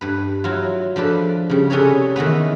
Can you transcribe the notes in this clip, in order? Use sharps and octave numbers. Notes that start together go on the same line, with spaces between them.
G2 B4
F#3 E4 F4
F3 D4 A4 B4
C#3 G3
C3 C#4 G#4 A4 B4 C#5
D#3 E3 B3 B4